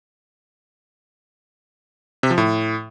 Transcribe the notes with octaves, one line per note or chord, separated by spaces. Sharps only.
C3
F3
A2